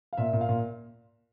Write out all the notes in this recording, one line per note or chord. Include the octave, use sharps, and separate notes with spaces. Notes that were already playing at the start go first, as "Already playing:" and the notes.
F5
A#2 E5
A#2
F5
A#2